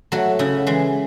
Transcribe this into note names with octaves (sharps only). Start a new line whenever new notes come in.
F#3 A3 F#4
C#3 E4
E3 G#3